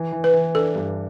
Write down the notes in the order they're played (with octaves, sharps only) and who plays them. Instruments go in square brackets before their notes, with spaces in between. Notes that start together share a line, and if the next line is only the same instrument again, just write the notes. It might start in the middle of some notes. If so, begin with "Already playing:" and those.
Already playing: [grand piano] E3
E3
[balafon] B4
[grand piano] E3
[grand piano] D4 [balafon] A4
[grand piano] G2